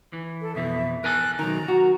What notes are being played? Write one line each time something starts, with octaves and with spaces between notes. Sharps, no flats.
E3
A4
F2 B2 E3 E5
A#4 G#5 A5 F#6
B1 D#3 A#5
F#4